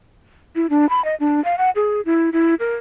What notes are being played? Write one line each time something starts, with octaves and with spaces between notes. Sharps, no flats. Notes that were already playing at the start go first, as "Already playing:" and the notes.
E4
D4
B5
D#5
D4
F5
F#5
G#4
E4
E4
A#4